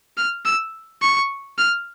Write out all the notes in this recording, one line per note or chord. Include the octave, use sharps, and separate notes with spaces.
F6
E6
C#6
F6